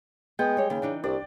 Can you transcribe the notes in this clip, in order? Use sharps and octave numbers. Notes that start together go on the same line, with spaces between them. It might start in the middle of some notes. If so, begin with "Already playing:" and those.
G#3 B3 G5
G3 C#5
D#2 C#3
E3 D4 D#4
C2 D4 D5